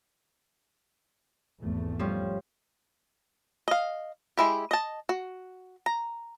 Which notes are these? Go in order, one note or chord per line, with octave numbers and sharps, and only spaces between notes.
G#1 E2 A3
F3 G3 C#4
D#5 F5
G#3 E4 G4
D#5 A5
F#4
A#5